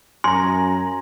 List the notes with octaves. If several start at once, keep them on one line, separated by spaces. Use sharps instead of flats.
F#2 G#5 A#5 C6